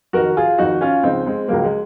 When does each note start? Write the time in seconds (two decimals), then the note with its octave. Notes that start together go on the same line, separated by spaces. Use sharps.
0.13 F2 D#3 F#4 A#4
0.37 F4 G#4
0.58 F2 D#3 D#4 F#4
0.81 C#4 F4
1.03 C#2 C#3 F3 C4 D#4
1.26 G#3 C4
1.48 C#2 C#3 F3 F#3 A#3
1.64 G#3